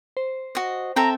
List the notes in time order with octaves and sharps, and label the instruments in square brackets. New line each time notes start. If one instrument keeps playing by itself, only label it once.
[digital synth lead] C5
[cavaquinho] F#4 D#5
[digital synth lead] C4 [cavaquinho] A4 E5 G5 [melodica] A#5